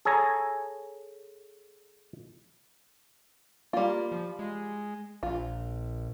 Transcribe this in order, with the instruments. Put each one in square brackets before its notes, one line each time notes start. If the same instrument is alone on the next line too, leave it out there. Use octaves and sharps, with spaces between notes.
[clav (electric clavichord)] G#4 A4 C#5 G#5 A#5
[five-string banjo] G3 F4 [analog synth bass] A#3
[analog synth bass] F3
G#3
[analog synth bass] A#1 [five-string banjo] F4